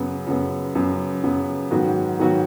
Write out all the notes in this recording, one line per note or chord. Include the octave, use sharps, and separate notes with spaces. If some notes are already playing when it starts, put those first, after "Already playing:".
Already playing: F#2 C#3 B3
F#2 C#3 B3
F#2 C#3 B3
F#2 C#3 B3
G#2 D#3 F#3 B3 F#4
G#2 D#3 F#3 B3 F#4